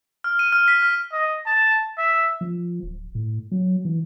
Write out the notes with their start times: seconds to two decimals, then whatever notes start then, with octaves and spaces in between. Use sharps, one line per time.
0.24 F6
0.39 D#7
0.52 F6
0.68 B6
0.82 F6
1.12 D#5
1.46 A5
1.98 E5
2.41 F3
2.83 D1
3.15 A2
3.52 F#3
3.85 E3